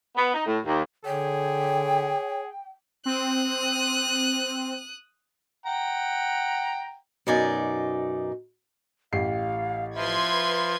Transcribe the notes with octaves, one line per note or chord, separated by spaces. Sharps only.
B3
D#4
A2
D#2
D3 G#4 C#5 G5
C4 D#6 F#6
F#5 G5 A#5
F#2 B2 D#4 D5 G#5
A1 G4 F5 C7
F3 B4 E5 C6 G#6